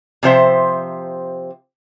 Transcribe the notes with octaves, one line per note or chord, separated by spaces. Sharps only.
C3 F3 C5 E5